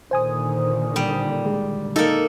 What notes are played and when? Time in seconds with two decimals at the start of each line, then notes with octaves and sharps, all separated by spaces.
0.11 A#2 D3 D#3 C5 G#5 D#6
0.96 G3
1.46 G#3
1.96 A#3 D#4 A4